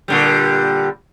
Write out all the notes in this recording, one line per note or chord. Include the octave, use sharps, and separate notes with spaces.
A#2 D3 G3